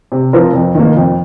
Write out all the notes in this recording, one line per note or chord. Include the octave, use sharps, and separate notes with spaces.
C3
F3 C4 F4 A#4
F2
D#3 A#3
F2